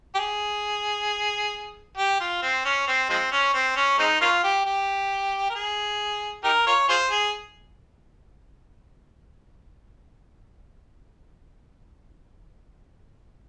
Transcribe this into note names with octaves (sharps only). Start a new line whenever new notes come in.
G4
G#4
G4
F4
C4
C#4
C4
F3 G#3 C4
C#4
C4
C#4
G#3 C4 D#4
A#3 C#4 F4
G4
G4
A#4
G#4
D#4 G4 A#4
F4 A#4 C#5
F4 G#4 C5
G#4